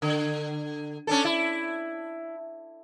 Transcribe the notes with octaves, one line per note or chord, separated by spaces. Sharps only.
D3
C#4 D4 A4
E4